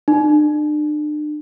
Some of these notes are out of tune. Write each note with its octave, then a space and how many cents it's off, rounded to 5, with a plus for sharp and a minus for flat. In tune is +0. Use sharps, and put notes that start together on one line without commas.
D4 +40